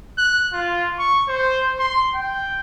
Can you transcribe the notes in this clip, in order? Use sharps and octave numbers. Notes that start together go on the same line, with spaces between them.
F#6
F4
C#6
C5
C6
G5